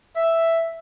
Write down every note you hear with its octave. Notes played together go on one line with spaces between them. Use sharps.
E5